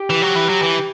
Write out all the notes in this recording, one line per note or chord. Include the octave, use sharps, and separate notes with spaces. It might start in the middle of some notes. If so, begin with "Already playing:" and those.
Already playing: G4
E3
F#3
E3
F#3
E3